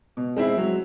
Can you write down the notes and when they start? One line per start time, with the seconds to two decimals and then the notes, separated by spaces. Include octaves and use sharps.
0.17 B2
0.36 G#3 C4 E4
0.57 F#3